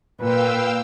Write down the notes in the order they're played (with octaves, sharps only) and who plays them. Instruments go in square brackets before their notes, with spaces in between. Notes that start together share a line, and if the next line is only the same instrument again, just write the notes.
[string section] A#2 [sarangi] B4 [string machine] F5 G5 E6